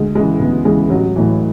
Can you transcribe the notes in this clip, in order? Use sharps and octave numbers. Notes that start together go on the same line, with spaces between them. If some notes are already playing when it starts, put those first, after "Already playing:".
Already playing: D2 G#3
C#3 E3 G#3
D2 B3
C#3 E3 G#3
A1 F#3
A2 E3